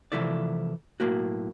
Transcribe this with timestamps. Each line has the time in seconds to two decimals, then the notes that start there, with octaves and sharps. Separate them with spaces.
0.12 C3 E3 F3 A3 E4 D5
1.00 B1 A2 A#3 F#4